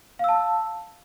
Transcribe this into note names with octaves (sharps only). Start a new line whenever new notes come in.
F5 A5 E6